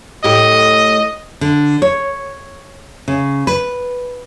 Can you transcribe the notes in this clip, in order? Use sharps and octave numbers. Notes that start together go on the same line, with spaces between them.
A2 G4 D#5
D3
C#5
C#3
B4